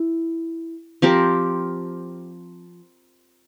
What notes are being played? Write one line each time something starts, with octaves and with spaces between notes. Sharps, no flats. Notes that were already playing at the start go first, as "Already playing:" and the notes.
Already playing: E4
F3 C4 G4 A#4